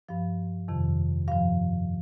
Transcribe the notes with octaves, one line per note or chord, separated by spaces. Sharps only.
G2 F3 F5
F2 C3 D#3
G2 F3 F5